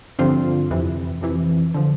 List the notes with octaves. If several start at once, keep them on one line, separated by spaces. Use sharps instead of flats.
G2 D3 F3 C4 F4
F2 C3 E3
F2 C3 E3
D3 F3